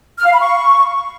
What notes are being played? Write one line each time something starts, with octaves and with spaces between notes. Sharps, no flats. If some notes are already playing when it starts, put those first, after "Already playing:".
F6
F5
B5
C#6